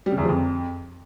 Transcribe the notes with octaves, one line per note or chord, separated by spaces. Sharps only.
G3
C#3
E2
F3
F2